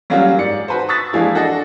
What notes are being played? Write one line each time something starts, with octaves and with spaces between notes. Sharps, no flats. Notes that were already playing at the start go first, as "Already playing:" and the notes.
F#3 G3 A#3 C#4 F4 F#4
G#2 D5 C#7
F#4 B4 C5
C#6 D#6 E6 F#6 A6 B6
E3 F3 G#3 A#3 D4 E4
D4 F#4 G#4 A4 D#5